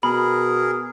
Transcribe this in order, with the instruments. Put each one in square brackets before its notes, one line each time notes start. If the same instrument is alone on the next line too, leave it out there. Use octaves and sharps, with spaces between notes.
[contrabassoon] B2 [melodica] G#4 A#4 [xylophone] B5